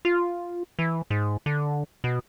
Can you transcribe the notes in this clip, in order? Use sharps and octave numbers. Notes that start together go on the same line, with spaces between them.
F4
E3
G#2
D3
B2